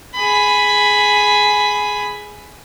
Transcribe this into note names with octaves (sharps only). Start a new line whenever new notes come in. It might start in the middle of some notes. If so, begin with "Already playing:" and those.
G#4 B5